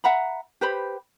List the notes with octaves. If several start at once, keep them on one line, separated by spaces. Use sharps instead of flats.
E5 F#5 A#5 B5
G4 B4 C5 B5